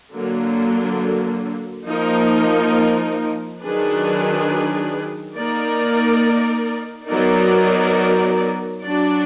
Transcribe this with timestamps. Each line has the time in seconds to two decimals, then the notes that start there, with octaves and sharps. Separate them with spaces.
0.14 D3 F#3 A#3
1.88 F3 A#3 D#4 A#4
3.62 D#3 F#3 D4 G#4 B4
5.36 A#3 D#4 A#4 D5
7.09 F#3 B3 D#4 A#4 D5
8.83 F#3 D4 F#4 D5